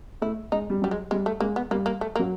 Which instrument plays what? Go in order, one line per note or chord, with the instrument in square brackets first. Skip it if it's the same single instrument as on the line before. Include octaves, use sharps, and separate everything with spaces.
[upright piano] A3 [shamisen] E4
[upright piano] G#3 [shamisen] D#4
[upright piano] G3
[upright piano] F#3 [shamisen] G3
[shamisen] G#3
[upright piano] G3 [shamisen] G#3
[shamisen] A3
[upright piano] G#3 [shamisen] A#3
[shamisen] B3
[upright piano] G3 [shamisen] A#3
[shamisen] A#3
A3
A#3
[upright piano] F#3